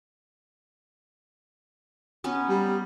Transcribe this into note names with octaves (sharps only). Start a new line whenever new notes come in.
B3 C#4 D#4
G3